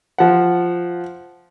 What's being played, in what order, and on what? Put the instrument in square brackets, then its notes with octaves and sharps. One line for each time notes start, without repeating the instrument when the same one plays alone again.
[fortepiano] F3 F#5